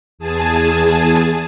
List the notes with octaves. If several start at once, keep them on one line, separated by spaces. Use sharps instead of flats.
E2 G#4 G#5 A5